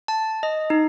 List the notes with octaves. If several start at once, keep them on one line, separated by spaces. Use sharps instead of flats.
A5
D#5
D#4